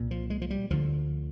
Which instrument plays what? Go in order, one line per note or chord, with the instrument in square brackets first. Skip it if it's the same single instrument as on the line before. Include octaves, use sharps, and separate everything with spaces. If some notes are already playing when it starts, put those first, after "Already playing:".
Already playing: [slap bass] C2 A#2
F3
G#3
F3
G3
D2 D3 F3